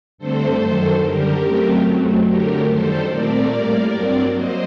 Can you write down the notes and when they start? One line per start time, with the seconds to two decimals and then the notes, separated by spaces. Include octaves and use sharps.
0.18 G2 D3 A3 C4 A4 C5
0.60 F#2 D#3 F#3
1.01 F#2 D3 G3 G4 A#4
1.43 F#2 F#3 A3 C4
1.84 F#2 F#3 A3 C4
2.26 D3 F#3 A3 G4 A#4
2.67 F#2 D#3 G3 A4 C5
3.08 A#2 A3 C4 A#4 D5
3.50 A2 G3 A#3
3.91 G2 F#3 C4
4.33 F#3 A#3 C5 D#5